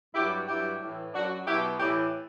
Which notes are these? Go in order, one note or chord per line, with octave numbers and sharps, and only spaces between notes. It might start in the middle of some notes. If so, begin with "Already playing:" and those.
G2 F#3 E4 G4
G2 F#3 E4 G4
A2 E3
F#2 F#3 D4 F#4
B2 F#3 E4 G4
A2 E3 E4 G4